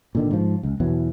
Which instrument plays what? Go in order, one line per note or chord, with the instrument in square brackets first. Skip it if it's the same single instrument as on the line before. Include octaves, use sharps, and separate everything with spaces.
[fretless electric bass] A#2 D3 D#3
G#2 F3
C#2
E2 B2 E3 F#3